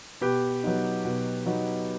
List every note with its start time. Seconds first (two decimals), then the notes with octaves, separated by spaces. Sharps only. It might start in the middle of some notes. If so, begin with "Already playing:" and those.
0.21 B2 G4 B4
0.63 F#3 B3 D#4
1.05 B2
1.46 F#3 B3 D#4